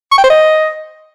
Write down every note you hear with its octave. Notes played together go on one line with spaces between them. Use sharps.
C#6
G5
C5
D#5